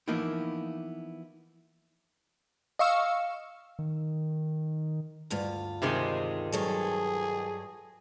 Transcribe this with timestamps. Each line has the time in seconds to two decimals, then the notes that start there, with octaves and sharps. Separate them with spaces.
0.08 E3 F3 A#3 B3 D#4 E4
2.79 D#5 F5 C#6 E6
3.79 D#3
5.30 D2 G2 F4
5.82 C3 D#3 G#3 C5
6.52 G2 F#3 G#4 A4